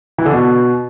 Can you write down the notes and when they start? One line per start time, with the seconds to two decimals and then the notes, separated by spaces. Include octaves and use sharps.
0.18 E3
0.26 D3
0.33 B2